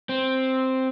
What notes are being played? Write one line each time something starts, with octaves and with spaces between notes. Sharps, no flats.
C4